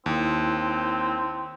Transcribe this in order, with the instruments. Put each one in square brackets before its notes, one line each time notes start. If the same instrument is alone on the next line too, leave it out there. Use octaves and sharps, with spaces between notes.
[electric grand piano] D#2 [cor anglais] C4 [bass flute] E4